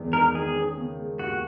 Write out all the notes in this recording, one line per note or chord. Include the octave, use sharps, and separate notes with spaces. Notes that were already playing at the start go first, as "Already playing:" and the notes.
Already playing: E2 D#3 G#3
D#4 A#4
D#3 G#4
C#4
C#3
G#3
D#2 F#4